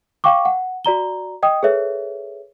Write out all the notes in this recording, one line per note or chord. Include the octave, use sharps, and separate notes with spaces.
F5 G5 C#6 D6
F#5
F#4 D5 A#5 G7
D#5 G5 D#6
G#4 A4 B4 C#5 E5